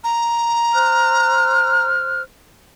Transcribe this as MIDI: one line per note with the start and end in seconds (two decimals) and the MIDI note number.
0.04 1.85 82
0.74 2.22 72
0.74 2.22 89
0.74 2.22 90